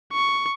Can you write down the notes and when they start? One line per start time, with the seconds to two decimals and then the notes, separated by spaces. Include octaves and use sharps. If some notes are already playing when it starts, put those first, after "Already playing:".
0.12 C#6